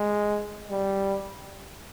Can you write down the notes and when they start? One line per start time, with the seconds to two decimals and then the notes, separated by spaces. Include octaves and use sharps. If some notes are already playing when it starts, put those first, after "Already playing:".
Already playing: G#3
0.70 G3